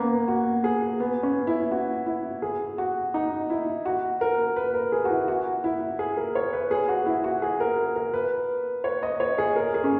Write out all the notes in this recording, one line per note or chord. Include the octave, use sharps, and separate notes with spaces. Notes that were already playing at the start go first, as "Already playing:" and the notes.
Already playing: A#3 B3 C#4
B3
F#4
G#4
B3
C#4
E4
F#4
E4
G#4
F#4
D#4
E4
F#4
A#4
B4
A#4
G#4
F#4
E4
F#4
E4
G#4
A#4
C#5
B4
G#4
F#4
E4
F#4
G#4
A#4
A#4
B4
C#5
D#5
C#5
G#4
A#4
G#4
C#4